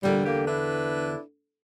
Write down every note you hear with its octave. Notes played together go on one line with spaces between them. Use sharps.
E2 A#2 D3 G3
G3 A#3 G4
D4 E4 B4